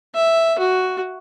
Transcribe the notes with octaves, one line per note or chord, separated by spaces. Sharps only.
E5
F#4